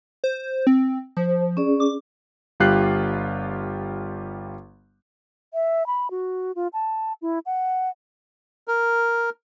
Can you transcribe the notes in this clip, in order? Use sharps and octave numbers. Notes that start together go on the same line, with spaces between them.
C5
C4
F3 C5
C#4 G#4 D5
D6
G1 G3 F4 G4 F#6 C7
E5
B5
F#4
F4
A5
E4
F#5
A#4